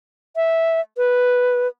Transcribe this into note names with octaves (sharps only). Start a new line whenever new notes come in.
E5
B4